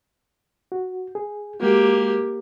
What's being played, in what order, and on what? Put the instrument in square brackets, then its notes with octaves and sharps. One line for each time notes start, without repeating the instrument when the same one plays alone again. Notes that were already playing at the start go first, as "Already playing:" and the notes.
[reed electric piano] F#4
G#4
[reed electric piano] G#3 F#4 [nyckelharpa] A#3 G4